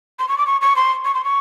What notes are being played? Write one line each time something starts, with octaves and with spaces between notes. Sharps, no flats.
C6
C#6
D6
C#6
C#6
C6
C#6
C6
C#6